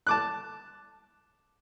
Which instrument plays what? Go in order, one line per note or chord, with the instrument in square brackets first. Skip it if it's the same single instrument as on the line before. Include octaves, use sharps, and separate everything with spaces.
[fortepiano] A5 D6 F#6